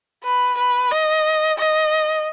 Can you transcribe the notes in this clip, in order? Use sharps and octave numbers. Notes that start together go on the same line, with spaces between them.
B4
B4
D#5
D#5